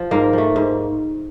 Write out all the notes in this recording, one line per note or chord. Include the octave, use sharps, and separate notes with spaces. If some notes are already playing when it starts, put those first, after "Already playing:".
Already playing: F3
G#2 A#3
F3 A3
G#2